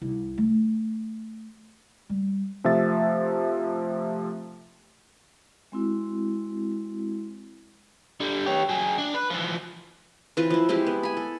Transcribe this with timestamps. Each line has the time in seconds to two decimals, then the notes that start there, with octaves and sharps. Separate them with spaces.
0.01 C2 E4
0.38 A3
2.09 G3
2.64 C3 F3 A3 E5 A6
5.72 G#3 C4 E4 F#4
8.20 D3 G3
8.46 G4 C#5
8.69 F#3 G#4
8.98 D4
9.14 B4
9.30 E3 F3
10.37 E3 C4 F4 B4
10.50 F3 E4
10.69 G#3 C4 E4 G4
10.87 B3
11.03 G#5 B5
11.17 A4